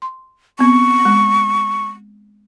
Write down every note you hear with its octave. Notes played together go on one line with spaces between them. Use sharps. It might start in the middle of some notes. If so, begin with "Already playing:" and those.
C6
B3 C4 C#6
G#3